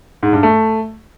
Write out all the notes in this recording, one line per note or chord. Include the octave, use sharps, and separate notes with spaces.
G#2
G2
A3